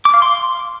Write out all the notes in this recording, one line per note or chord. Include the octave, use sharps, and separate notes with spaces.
D6
F5
C6